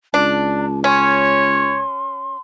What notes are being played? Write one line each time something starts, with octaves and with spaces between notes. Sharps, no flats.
C#2 D4 A5
C#4 C#5 C6